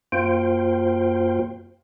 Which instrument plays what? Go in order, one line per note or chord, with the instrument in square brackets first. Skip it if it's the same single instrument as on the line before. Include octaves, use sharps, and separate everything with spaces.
[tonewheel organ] F#2 A#3 F4 C5 G5